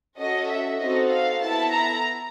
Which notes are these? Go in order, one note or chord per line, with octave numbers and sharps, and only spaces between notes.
C#4 F#4 A4 D#5
E5
C4 D#4 F#4 A4 D#5
F5
B3 E4 A4 A5
A#5